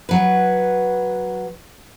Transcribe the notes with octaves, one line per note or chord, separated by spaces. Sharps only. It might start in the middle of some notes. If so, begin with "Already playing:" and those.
F#3 B4